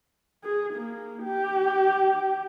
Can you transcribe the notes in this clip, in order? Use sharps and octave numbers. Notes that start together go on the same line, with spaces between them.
G#4
A#3
G4